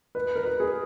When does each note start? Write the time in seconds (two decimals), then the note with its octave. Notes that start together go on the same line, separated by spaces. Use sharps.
0.15 B4
0.36 A#4
0.45 B4
0.60 G#4